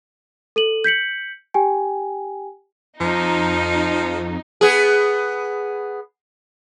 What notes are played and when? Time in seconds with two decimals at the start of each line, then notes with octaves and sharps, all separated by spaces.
0.56 A4 D#7 F#7
0.84 G6 B6 C#7 F#7
1.54 G4 G5 G#5
3.00 F2 F3 D#4
4.61 B3 G#4